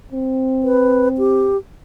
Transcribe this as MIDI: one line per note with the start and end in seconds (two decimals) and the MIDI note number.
0.13 1.53 60
0.63 1.08 71
1.18 1.57 67